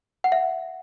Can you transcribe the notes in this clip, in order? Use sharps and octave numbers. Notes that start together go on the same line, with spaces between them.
F#5
E5